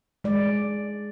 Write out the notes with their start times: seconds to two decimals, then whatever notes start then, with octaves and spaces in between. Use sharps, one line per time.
0.24 G#3 D5